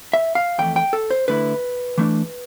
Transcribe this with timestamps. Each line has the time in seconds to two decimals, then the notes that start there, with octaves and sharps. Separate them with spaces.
0.13 E5
0.35 F5
0.58 F2 E3 A3 G5
0.76 G5
0.93 A4
1.11 C5
1.28 D3 A3 E4 B4
1.98 E3 A3 D4